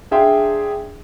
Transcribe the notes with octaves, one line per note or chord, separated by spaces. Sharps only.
D4 G#4 E5 F5 G5 C6